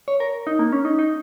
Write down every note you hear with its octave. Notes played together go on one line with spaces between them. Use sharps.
C#5
A#4
D#4
A#3
C#4
D#4
D#4